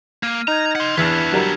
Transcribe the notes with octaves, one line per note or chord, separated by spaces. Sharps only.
A#3 F6 D#7
D#4 A#5 F6 G6 G#6
F#5 C6
E2 E3 B3 D4 E6 G#6 F7
F#3 G3 A#4